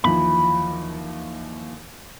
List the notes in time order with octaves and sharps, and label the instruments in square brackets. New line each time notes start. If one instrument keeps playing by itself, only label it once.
[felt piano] D#2 E3 F3 [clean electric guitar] B5